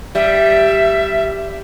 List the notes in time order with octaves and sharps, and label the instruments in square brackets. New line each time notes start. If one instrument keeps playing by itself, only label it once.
[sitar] G3 [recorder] E5